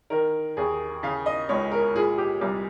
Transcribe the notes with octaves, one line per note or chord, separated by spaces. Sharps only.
D#3 A#4
D#2 G#4
C#3 F5
D#5
C#2 C#5
A#4
A#2 G#4
G4
C2 G4